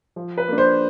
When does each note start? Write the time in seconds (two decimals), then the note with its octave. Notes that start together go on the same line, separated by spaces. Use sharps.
0.16 F3
0.38 B4
0.48 A#3 D4
0.58 C5